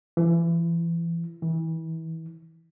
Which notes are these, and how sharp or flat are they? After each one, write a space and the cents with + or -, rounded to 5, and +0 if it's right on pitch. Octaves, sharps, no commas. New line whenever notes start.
E3 +30
E3 -30